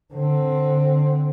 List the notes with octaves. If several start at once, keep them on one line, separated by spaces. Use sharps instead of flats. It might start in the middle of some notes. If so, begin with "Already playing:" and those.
D3 C4